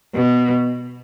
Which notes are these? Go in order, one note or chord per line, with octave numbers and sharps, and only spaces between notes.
B2